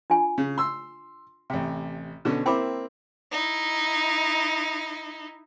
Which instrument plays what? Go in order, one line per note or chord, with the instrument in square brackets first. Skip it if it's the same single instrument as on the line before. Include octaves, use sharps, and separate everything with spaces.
[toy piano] D4 F4 G#5
[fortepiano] C#3
C6 E6
A1 C3
B2 D3 C#4
[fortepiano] A#3 C4 E4 [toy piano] G5 B5 D6
[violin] D#4 E4